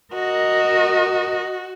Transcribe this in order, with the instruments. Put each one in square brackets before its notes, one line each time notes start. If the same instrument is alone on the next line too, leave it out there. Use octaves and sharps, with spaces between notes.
[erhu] F#4 [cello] A#4 D#5